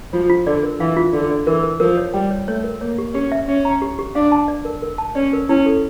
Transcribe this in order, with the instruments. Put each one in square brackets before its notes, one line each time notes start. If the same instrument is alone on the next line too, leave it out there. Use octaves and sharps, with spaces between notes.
[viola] F3 [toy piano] F4
[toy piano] F4
[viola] D3 [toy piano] D5
[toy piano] A#4
[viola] E3 [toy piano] F5
[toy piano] F4
[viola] D3 [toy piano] F4
[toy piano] D5
[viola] E3 [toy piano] A#4
[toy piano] A#4
[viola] F3 [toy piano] A#4
[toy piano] C#5
[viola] G3 [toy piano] G5
[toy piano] C#5
[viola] A3 [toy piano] C#5
[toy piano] A#4
[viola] A#3 [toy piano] C#5
[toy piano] G4
[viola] C#4 [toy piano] G4
[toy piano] E5
[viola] C#4 [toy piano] E5
[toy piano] A#5
G4
G4
[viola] D4 [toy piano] F5
[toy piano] A5
D5
A#4
A#4
A5
[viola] C#4 [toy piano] D5
[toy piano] A#4
[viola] C#4 [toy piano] E4
[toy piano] A4